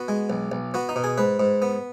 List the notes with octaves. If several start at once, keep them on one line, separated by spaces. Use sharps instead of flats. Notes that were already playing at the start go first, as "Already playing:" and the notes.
Already playing: B3 F#4
G#3
B1
B1
B3 F#4
D#4
B2
G#4
G#2 B4
G#2
B3